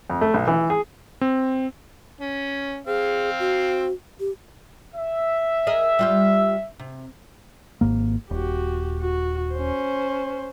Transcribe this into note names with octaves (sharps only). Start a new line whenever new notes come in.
F2
A3
B1
E3
G#4
C4
C#4
C4 G#4 F5
F#4
G4
E5
G#4 A#4 D#5
G3 F4 G4
C3
G#1 G#2 A#3
D#1 F#4 G4
F#4
C#4 C5